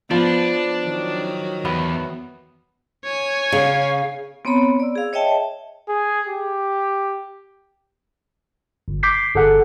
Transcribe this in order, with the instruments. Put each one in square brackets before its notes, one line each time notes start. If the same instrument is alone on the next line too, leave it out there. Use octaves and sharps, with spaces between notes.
[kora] F3 [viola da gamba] B3 [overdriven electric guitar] D4
[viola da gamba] D#3 F#3 F#4
[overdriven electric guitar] E2 [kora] B3
[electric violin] C#5 G#5
[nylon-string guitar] C#3 [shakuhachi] F5
[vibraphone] B3 C4 C#5 A#5 B5
D5 E6
G#4 F5
C#5 D#5 E5 G5 A5
[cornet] G#4
G4
[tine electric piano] G1
D6 G6 B6 C7
G1 G#4 A4 F#5